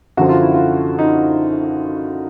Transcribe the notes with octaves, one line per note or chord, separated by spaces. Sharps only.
F#2 D3 F3 F#4
F4
E4
F4
D#4